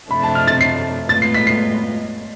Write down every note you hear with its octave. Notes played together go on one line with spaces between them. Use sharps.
C3 F3 A3 D4 B5
A5
F6
A6
C7
A2 G#3 B3 F4 B4 A6
C7
B6
C7